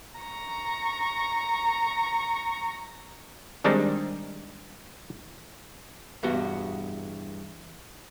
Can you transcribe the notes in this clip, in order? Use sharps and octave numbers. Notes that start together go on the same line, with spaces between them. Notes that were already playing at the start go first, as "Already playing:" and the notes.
A#5 C#6
D#3 G3 G#3 C4 D4 D#4
E2 G2 B2 F#4